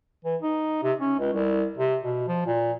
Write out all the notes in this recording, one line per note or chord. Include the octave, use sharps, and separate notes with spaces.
E3
D#4
C3
C#4
C#2
C2
C3
B2
F3
A#2